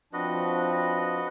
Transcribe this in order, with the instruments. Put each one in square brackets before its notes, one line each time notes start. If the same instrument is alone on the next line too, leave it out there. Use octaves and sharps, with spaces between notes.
[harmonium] F3 C4 D4 [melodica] F#4 B4 D#5